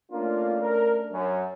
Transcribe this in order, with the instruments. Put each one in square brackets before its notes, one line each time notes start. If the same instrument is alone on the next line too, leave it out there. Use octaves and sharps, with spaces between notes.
[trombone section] A3 C#4 D4 [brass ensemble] A#3 F4
[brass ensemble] A#4
F#2